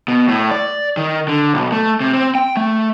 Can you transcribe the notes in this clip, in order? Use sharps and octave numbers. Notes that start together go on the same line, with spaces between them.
B2
A2
D5
D#3
D3
B1
A3
C3
C4
G5
A3